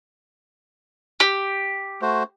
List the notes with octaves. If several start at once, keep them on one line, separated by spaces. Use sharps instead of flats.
G4
A3 F#4 C5